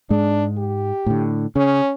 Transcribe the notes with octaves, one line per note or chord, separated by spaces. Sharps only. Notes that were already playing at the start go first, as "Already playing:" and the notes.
G#2 G#3 D4
G4
A2 D3
C#3 C#4